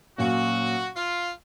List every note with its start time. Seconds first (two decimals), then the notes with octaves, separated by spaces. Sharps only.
0.18 A#2 F#3 A#3 C#4 F#4
0.96 F4